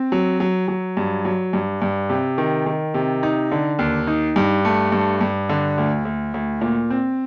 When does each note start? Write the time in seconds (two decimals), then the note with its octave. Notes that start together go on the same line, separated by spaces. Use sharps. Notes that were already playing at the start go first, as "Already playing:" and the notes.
Already playing: C4
0.12 F#3
0.40 F#3
0.68 F#3
0.97 G2
1.25 F#3
1.53 G2
1.82 G2
2.10 C3
2.38 D#3
2.66 D#3
2.94 C3
3.23 D#4
3.52 D3
3.79 D#2
4.07 D#4
4.36 G2
4.65 A3
4.92 G2
5.21 G2
5.49 D3
5.78 D2
6.05 D2
6.34 D2
6.61 A#2
6.90 C4